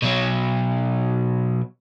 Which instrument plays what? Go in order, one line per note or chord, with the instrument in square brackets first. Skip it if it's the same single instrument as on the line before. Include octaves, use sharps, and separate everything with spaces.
[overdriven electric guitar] B2 F#3